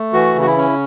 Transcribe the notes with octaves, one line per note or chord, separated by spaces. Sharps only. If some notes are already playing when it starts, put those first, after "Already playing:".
Already playing: A3
E3 F#4
C#3
F#4
E4
C#4